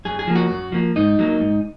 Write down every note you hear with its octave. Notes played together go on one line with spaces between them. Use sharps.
F#2 G#4
G#4
F3 A#3
F#4
F#2
F3 A#3
G#2 D#4
F#3 A#3
G#2